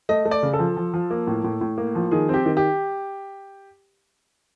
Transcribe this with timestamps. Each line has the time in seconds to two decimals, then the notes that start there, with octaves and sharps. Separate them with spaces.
0.09 A3 D#5
0.25 A3
0.31 D5
0.43 C#3
0.53 A4
0.59 F3
0.77 F3
0.94 F3
1.11 A#3
1.27 A2
1.44 A2
1.61 A2
1.78 A#3
1.95 F3
2.11 D#3 G#4
2.29 C4 G4
2.46 D#3
2.57 G4